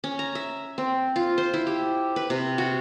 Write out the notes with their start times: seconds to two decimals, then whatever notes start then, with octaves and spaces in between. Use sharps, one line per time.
0.04 C#4
0.19 A#5
0.35 E5
0.78 C4
1.16 F4
1.38 C5
1.54 E4
1.67 G4
2.16 B4
2.30 C3
2.58 F#4